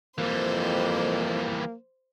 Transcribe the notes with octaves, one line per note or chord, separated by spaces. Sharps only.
F2 E3 G3 A#3 C5